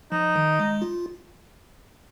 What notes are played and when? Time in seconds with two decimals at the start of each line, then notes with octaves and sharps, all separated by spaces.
0.12 F3 D#4
0.36 D#3
0.59 G#3
0.82 F4